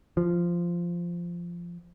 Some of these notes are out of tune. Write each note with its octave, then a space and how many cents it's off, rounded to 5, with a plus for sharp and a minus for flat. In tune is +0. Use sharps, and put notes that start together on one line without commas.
F3 -10